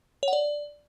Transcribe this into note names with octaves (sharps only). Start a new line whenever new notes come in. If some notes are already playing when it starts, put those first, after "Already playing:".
C#5
F#5
D5